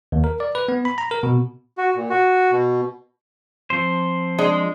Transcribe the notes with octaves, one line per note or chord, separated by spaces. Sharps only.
D#2
A#4
D5
B4
B3
B5
A#5
A#4
B2
F#4
A#2
F#4
B2
F3 C4 C5
G#3 D4